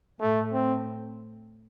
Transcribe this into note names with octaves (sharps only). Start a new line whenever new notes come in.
A2 A3
C4